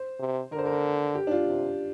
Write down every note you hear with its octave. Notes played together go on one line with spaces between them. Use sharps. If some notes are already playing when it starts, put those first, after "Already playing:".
Already playing: C5
C3
D3 A#4
C5
A#4
G4
D4
F4
C3